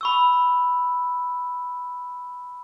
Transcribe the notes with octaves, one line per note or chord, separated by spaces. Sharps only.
B5 C#6 E6